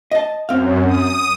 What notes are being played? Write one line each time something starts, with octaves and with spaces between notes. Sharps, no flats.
D#5 A5
F#2 C4 F5
D#6